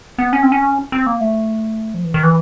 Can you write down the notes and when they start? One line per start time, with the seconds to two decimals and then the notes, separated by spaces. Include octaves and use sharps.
0.18 B3
0.33 C#4
0.43 C4
0.52 C#4
0.92 C4
1.07 A#3
1.21 A3
1.94 F3
2.04 E3
2.14 D#3
2.23 E3